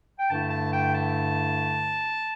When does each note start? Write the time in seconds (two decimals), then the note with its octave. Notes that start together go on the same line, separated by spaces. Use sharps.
0.19 G5
0.30 G2 D3 A3 E4 A5
0.51 A5
0.72 G5
0.94 A5